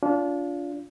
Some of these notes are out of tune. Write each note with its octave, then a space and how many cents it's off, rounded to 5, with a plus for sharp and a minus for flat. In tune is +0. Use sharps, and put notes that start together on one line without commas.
D4 -30 F4 +0